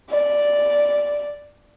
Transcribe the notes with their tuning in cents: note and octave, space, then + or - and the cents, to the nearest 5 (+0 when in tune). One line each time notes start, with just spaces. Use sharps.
D5 -5